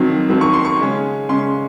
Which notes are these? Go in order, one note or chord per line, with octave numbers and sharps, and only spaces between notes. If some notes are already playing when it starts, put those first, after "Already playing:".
Already playing: F2 D#3 F#3 C4
F2 D#3 F#3 C4
C#6
C6
C#6
C#3 G#3 C#4
C#3 G#3 C#4 C6